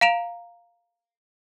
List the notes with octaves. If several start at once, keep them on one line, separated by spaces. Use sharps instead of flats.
F5 A#5 D7 E7 F7